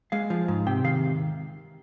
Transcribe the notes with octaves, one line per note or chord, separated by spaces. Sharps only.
G#3 F5
F3
G#2
C3 G5
D#3 F5